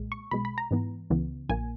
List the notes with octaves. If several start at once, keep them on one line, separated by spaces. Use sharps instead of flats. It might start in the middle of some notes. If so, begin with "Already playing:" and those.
Already playing: B1 A#2 G#3
C#6
B1 B2 G#3 B5
B5
A#5
G#2 E3 B3
C#2 C#3 E3 B3
A#1 A#2 A#3 G#5